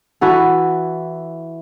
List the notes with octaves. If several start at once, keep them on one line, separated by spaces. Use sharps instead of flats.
E3 E4 F#4 A4